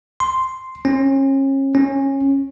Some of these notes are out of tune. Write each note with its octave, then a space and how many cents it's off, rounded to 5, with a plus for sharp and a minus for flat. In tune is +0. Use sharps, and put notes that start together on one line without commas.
C6 -5
C#4 -35
C#4 -20